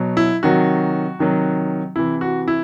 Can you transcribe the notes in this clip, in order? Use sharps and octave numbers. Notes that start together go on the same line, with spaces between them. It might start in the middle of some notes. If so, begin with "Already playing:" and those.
Already playing: B2 F#3
E4
C3 D#3 F#3 F#4
C3 D#3 F#3
C3 E3 E4
F#4
E4